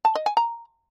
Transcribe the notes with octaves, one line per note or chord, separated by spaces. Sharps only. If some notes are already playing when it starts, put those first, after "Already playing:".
A5
D#5
G#5
A#5